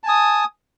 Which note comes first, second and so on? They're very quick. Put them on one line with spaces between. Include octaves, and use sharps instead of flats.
A5 G#5 D#6